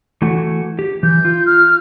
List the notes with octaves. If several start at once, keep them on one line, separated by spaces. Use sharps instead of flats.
E3 A3 F#4
G4
E3 G6
F4
F6